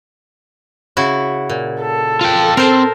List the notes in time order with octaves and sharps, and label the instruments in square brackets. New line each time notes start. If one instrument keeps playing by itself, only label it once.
[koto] C#3 E4 F#4
A#2
[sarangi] A4
[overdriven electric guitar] F4 G5
[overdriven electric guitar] C4 [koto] A#4 C5